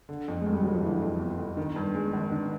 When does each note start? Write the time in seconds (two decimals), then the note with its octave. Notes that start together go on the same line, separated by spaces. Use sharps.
0.09 D3
0.28 F2
0.41 G#3
0.46 G1
0.52 G3
0.63 G1 F#3
0.73 F3
0.83 D3 E3
1.02 F2
1.20 G1
1.39 G1
1.57 D#3
1.76 G2
1.95 G#3
2.13 G#1
2.32 D3 D#3